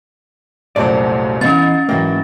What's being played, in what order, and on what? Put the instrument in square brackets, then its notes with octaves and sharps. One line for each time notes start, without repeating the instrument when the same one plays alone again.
[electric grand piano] C2 F#2 A#2 [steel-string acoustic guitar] A3 C5 F#5 [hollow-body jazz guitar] D5
[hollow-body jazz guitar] E3 B3 [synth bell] C#4 A6 [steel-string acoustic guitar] D#4 [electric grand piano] D#5 F5 G6
[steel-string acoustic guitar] G#2 E3 E4 [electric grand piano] F#3 G5 A#6 [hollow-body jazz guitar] A#3